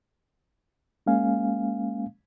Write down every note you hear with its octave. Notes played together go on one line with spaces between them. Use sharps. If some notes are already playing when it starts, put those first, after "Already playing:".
G#3 A#3 C#4 F5 G#5